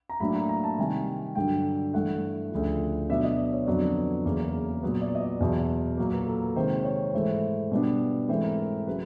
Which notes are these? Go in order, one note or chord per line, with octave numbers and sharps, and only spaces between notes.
A#5
A2 F#3 A#3 D4 B5
A#5
A#5
A5
C3 D#3 G3 G#5
G2 D3 F#3 G5
G2 E3 A3 F#5
D2 C#3 F3
B2 F#3 B3 D4 E5
D#5
D5
C#5
F2 D3 F#3 B3 D5
E2 C#3 F#3 A#3 C#4
A#2 F#3 B3
D5
D#5
D5
E2 B2 F#3
A#2 F#3 A#3
B4
A4
A#4
C3 D#3 G#3 C5
C#5
G#2 E3 A3 C5
B2 G3 B3 D4
G#2 E3 A3 C4 C5
A#4
B4
C#3 F#3 B4